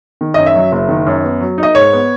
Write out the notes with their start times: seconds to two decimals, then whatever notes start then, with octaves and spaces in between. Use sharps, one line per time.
0.21 D#3
0.34 F#2 D#5
0.46 E5
0.56 F#3
0.72 F#1
0.89 D#3
1.07 F#2
1.24 B3
1.41 F#3
1.58 D#4
1.63 D#5
1.75 G#2 C#5
1.93 B3